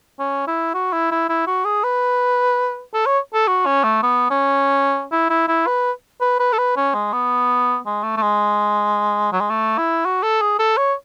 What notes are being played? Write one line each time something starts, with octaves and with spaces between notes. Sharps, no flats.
C#4
E4
F#4
E4
E4
E4
F#4
G#4
B4
A4
C#5
A4
F#4
C#4
A3
B3
C#4
E4
E4
E4
B4
B4
B4
A4
B4
C#4
G#3
B3
G#3
A3
A3
G#3
F#3
G#3
A3
E4
F#4
A4
G#4
A4
C#5